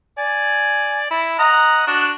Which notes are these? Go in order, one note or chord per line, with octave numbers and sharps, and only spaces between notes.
D5 G#5
E4
D#5 F#5 A#5
D4 F#4